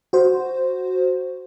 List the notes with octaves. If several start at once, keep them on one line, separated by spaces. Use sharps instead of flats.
F#4 C5